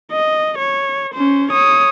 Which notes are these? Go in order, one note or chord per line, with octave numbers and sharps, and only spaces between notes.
D#5
C#5
C#4 C5
C#5 D#6